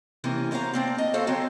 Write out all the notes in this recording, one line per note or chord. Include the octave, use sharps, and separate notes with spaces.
C3 E3 A#3 C#4
B2 F#3 C5 F5 A#5
A#3 C4 D4
D#5
F#4 A4 C5 F5
D3 F#3 C4